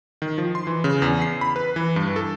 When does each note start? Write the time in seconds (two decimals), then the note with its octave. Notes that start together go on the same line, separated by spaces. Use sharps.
0.22 D#3
0.38 F3
0.55 C6
0.67 E3
0.84 C#3
1.02 E2
1.22 C7
1.41 B5
1.56 B4
1.76 E3
1.96 G2
2.16 A4